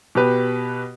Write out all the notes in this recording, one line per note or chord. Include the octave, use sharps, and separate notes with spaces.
B2 G4 B4